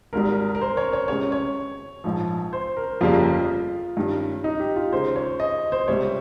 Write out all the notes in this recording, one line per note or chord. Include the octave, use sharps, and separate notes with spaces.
G#1 G#2 G3 A#4
A#4
C5
C#5
C#5
C#2 C#3 G#3 C#4 G4 C#5
C#5
A#1 G#2 F3
C5
A#4
G1 F2 C#3 G3 A#3 F4
G2 D#3 G3 C#4
D#4
G4
F4
D#2 C#3 G#3 D#4 C5
C#5
D#5
C5
C#2 C3 G3 C#5